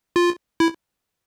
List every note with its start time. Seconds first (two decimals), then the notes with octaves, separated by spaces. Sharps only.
0.16 F4
0.60 E4